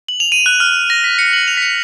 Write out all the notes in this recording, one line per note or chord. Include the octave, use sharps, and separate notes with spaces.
F#7
F7
D#7
F#6
F6
A#6
B6
C#7
F#7
F7
B6
C#7